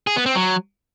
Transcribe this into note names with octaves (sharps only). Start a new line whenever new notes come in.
G#4
B3
C4
F#3